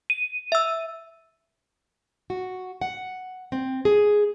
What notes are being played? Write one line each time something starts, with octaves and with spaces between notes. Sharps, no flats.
D#7
E5 E6
F#4
F#5
C4
G#4